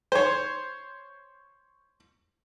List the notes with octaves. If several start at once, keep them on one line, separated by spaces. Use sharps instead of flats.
C5 C#5